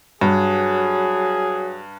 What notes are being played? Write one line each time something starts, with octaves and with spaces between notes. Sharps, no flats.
G2 F#3 G#4